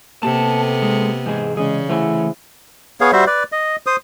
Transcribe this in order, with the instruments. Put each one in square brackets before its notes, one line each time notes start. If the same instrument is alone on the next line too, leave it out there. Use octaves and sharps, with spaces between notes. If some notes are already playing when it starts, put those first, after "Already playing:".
[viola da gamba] C3 B3 [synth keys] A#3 G4 [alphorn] A4 [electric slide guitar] A5
[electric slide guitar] G#3
[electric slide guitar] E2 G#2 G#4 [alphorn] G#3 [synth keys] F#5 G#5 G6
[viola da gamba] C#3 [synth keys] E3 C#4 D5 [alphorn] G#3 [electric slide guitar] G#4
[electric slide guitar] E3 A3 G#5 [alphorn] E4 [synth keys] G#4 C5 F#5
[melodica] B3 G#4 C#5 F5
G3 F#4 C5 E5
B4 D5
D#5
C5 D#6